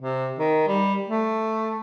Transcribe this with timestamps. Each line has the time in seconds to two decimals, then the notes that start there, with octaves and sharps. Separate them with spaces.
0.01 C3
0.39 D#3
0.68 G3
1.09 A3